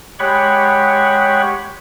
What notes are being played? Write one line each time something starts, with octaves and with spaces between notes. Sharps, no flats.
G#3 G4 C#5 F#5 B5 C#6